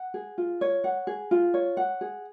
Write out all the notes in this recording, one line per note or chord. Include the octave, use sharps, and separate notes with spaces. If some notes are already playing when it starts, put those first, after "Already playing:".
Already playing: F#5
G#4
F4
C#5
F#5
G#4
F4
C#5
F#5
G#4